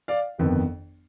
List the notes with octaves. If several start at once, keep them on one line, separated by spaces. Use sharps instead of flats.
D5 F5
G1 F2 D#3 B3